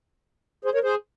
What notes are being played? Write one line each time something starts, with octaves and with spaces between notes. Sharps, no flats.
G#4 C5
A#4 C#5
G#4 C5